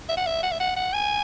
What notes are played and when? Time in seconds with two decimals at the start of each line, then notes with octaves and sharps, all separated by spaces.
0.09 E5
0.17 F#5
0.26 E5
0.43 F#5
0.52 E5
0.60 F#5
0.76 F#5
0.93 G#5